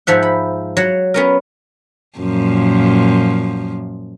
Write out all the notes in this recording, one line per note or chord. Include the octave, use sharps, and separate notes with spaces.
G#2 F3 E5 F#5
B5
F#3 F#5
B3 C#4 A#4
F#2 A#2 F3